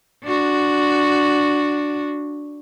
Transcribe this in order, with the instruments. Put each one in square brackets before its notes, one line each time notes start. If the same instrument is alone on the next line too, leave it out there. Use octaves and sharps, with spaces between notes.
[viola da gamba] D4 F#4